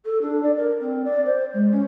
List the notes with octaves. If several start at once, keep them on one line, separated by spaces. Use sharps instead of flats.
A4
D4
D5
A#4
C4
D5
C5
G#3
C#4